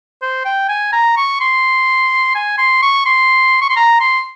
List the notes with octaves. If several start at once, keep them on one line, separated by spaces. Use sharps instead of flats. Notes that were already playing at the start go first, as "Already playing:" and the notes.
C5
G5
G#5
A#5
C#6
C6
G#5
C6
C#6
C6
C#6
C6
A#5
C6